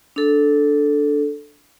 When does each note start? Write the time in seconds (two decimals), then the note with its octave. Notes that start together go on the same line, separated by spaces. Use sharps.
0.16 D4 A4